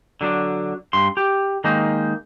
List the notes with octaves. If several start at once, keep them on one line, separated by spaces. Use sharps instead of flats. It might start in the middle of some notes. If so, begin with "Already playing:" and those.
D3 F#3 D4
G2 C6
G4
D#3 G#3 A#3 D#4